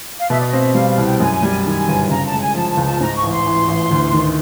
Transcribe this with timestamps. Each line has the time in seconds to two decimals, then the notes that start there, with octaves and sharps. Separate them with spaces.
0.18 F5
0.30 B2 E5
0.40 D5
0.45 D#5
0.53 C4 F5
0.60 E5
0.75 G3 F5
0.90 F5
0.98 C2
1.05 G5
1.20 F#2 G#5
1.43 G3
1.65 D#3 G#5
1.88 G1
2.10 C#3 A#5
2.26 A5
2.33 G#3
2.40 G#5
2.55 F3 A5
2.70 A5
2.77 C#2
2.85 A5
3.00 G#2 A#5
3.16 C#6
3.23 A1
3.30 C6
3.46 E3
3.68 A1
3.91 D2
4.13 D#3